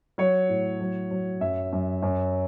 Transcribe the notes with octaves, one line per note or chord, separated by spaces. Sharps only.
F#3 C#5
A2
F#3
F#3
F#2 E5
F#2
F#2